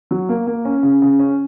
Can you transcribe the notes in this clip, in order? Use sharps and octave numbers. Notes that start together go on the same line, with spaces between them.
F#3
A#3
A#3
C#4
C#3
C#3
C#4